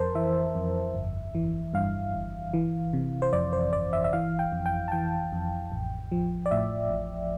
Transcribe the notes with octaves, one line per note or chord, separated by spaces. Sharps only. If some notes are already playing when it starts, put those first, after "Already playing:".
Already playing: F2 A#4 C5 A5
E3 E5
F2
G1
E3
G2 F5
G1
E3
C3
C5
F2 D5
C5
G1 D5
E5
E5
E3 F5
G5
F2
G5
A5
E3 G5
F2
A1
F3
D5
A2 E5
A1